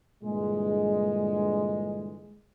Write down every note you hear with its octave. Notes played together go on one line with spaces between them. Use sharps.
G2 A#2 D3 E3 G#3